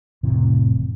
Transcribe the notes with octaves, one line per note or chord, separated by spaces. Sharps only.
F1 A2 C3 E3